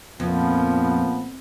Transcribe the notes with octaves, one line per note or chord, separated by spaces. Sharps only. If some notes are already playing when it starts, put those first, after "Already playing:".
F2 A#2 F3 B3